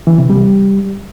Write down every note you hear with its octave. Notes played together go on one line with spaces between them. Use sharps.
E3
C3
G3